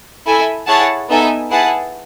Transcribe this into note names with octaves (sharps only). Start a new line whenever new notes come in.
E4 A4 E5 G#5
E4 G#4 C#5 F#5 A5
B3 D#4 A4 E5 G#5
E4 G#4 B4 F#5 A5